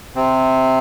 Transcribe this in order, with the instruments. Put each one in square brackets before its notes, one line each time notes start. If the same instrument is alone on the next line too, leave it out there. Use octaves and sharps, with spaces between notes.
[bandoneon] C3 C4